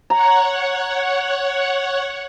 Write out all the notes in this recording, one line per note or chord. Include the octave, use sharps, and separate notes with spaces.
C#5 F#5 A#5